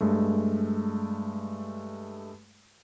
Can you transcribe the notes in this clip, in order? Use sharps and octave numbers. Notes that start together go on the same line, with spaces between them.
G2 G#3 A3